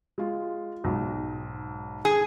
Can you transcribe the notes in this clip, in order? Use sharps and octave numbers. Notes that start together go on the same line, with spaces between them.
G#3 F4
B1 G#2
G#4